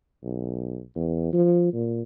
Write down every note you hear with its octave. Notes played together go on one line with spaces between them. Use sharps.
B1
E2
F3
A#2